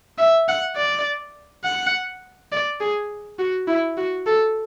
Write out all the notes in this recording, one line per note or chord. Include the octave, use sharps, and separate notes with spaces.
E5
F#5
D5
F#5
D5
G#4
F#4
E4
F#4
A4